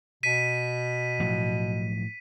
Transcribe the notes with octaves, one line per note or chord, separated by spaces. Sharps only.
B2 B6 D#7
A2 F3 F#3